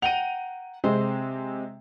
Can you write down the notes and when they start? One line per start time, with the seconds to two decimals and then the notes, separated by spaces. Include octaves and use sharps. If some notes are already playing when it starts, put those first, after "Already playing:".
0.02 F#5 G5 A#5 D#7 F7
0.84 C3 G#3 C4 C5